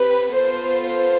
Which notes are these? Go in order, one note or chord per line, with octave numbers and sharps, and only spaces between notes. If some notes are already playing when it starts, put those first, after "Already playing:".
Already playing: C4 G4 B4
B3 F4 A4 C5
C5